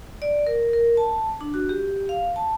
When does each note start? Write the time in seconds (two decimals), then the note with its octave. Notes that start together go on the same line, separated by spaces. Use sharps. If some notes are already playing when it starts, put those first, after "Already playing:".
0.22 D5
0.47 A#4
0.73 A#4
0.97 A5
1.41 D4
1.54 F#4
1.69 G4
2.09 F5
2.36 A5